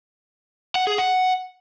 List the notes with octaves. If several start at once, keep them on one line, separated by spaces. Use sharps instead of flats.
F#5
G#4
F#5